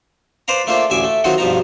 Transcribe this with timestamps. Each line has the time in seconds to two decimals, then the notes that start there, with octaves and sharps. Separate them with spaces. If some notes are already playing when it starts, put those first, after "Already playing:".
0.48 B4 C5 D5 F5 A#5
0.67 A3 A#3 D4 F4 C5
0.90 A1 D2 E5 G#5 D6
1.04 A3
1.24 D#3 F#3 C4 D#4 F4 F#4
1.38 G2 B2 F3 D#4 A#5